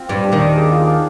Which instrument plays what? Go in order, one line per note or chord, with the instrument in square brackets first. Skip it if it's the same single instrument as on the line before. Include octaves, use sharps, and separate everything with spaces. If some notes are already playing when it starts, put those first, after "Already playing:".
Already playing: [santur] C4 F4
[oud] G2 G3 [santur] G4
[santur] D4
[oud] D#2 D#3
[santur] D5
G#4
F4
D4